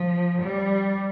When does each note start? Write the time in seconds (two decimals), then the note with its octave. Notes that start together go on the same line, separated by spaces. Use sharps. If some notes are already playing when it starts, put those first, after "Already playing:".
Already playing: F3
0.41 G3